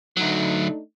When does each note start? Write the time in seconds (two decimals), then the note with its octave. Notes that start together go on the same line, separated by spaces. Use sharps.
0.17 D2 F#3 A3 D4 D#4